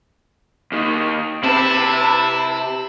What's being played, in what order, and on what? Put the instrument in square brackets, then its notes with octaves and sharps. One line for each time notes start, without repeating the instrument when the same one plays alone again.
[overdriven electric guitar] D#2 D#3
[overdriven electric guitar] C3 C4 [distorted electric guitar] E4 [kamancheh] B4 A5